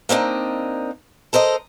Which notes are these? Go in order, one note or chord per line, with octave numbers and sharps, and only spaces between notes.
A#3 C4 D4 D#4
A4 A#4 C5 D#5